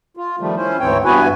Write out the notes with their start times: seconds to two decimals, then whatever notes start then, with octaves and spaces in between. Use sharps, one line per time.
0.17 F4
0.40 D#3 F3 G3 A3
0.57 C#4 E4 C5
0.80 D2 G#2 E3 C4 C#5 G5
1.05 G2 B3 E4 F#4 B4 G#5